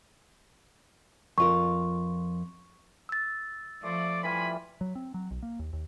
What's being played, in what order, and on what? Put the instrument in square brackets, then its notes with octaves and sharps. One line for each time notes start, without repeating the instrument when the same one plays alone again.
[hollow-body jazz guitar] F2 F4 A#4 [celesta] C#6
[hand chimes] E6 A6
[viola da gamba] F3 [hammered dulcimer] A3 C6 [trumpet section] D5
[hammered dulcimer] E3 G3 F4 [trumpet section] G#5 B5
[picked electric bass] F#3
C4
F#3
B1
A#3
D#2
D#2